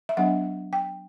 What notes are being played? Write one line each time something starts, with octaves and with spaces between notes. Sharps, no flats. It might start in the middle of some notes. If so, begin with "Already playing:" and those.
E5
F#3 B3 D4 F#5
G5